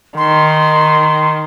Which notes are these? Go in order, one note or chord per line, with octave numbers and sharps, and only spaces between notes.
D#3 C6